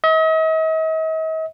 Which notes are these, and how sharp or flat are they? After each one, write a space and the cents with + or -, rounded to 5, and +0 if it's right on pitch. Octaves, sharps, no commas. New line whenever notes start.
D#5 +45